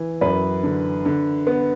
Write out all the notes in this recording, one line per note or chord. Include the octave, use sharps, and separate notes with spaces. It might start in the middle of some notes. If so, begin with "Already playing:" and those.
Already playing: E3
F#2 B4
D3
D3
B3